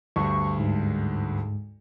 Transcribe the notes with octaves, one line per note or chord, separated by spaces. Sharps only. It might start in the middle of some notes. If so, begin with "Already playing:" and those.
D2 G2 C#6
G#2